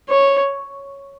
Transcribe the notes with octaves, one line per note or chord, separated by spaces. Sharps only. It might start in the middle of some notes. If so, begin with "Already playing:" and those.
C#5